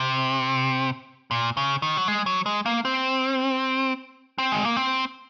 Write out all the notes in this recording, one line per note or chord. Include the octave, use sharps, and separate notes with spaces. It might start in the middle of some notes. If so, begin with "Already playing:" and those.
Already playing: C3
A#2
C#3
D#3
F#3
G#3
F#3
G#3
A#3
C4
C4
G#3
A#3
C4